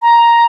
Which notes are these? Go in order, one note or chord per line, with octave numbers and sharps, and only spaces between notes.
A#5